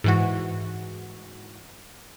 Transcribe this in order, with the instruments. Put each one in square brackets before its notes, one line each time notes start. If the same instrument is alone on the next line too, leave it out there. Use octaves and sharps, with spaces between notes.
[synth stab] G#2 E3 F#4